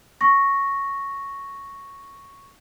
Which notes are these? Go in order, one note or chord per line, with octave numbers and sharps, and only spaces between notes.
C#6 A#6